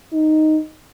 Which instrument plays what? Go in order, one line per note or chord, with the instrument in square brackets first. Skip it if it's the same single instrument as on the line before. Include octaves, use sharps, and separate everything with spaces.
[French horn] D#4